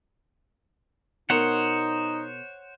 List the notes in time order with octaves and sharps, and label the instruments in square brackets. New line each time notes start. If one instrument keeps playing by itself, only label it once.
[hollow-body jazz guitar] B2 A#4 [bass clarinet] D#4 [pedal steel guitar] C5 C#5 F#5